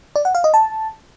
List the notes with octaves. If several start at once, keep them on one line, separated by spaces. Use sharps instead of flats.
D5
F#5
F5
D#5
A5